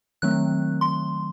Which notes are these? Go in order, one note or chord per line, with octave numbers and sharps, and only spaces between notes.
D#3 F#3 A3 C4 F#6
C6